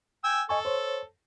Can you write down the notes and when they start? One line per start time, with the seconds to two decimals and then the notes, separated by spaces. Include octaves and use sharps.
0.24 G5 G#5 E6
0.49 A4 D#5 G#5 C#6
0.65 C5 C#5